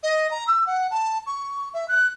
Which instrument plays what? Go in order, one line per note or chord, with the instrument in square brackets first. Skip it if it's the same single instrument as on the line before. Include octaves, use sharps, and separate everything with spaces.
[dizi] D#5
A#5
E6
F#5
A5
C#6
E5
F#6